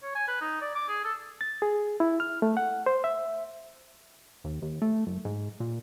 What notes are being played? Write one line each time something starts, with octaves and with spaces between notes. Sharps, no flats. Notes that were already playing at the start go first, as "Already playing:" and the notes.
C#5
G#5
B4
D#4
D5
D6
G#4
A4
A6
G#4
E4
F6
A3
F#5
C5
E5
D#2
D#2
A3
F#1
G#2
A#2